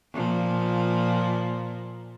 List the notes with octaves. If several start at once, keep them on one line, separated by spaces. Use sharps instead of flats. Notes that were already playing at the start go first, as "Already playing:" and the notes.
A#2 F3